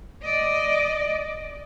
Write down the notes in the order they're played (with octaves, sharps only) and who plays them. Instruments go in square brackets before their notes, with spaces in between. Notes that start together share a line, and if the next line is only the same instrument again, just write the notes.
[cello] D5 D#5